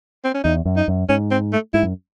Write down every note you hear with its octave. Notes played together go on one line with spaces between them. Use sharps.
C4
C#4
E2 D#4
F#2
D#4
F#2
G#2 C#4
C4
A3
G#2 E4
F#2